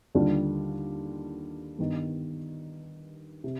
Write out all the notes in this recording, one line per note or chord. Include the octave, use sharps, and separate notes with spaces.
D#2 D3 G3 D4 F4
G2 D#3 B3
C3